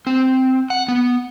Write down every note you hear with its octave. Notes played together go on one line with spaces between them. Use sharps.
C4
F#5
B3